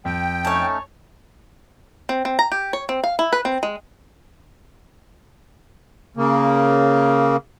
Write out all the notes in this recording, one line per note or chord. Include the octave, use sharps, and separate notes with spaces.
F2 G5
A3 C#4 D#4 C#5 A5
C4
C4
A#5
G4
C#5
C4
F5
E4
B4
C4
G#3
C#3 A#3